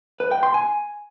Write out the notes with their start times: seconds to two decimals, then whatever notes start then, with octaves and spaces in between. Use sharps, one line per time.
0.20 B4
0.31 G5
0.43 C6
0.54 G#5